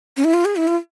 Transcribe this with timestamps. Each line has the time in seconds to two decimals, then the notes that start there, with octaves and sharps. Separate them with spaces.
0.17 C#4
0.24 E4
0.34 F4
0.45 G#4
0.56 E4
0.68 F4